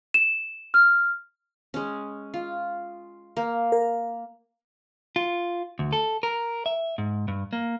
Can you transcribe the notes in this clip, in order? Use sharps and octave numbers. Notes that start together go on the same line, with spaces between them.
E7
F6
G#3 C#4
F4
A#3
A#4
F4
D2
A4
A#4
E5
G#2
G2
A#3